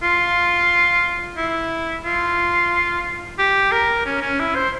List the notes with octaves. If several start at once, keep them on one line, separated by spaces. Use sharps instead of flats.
F4
E4
F4
G4
A#4
C#4
C#4
E4
C5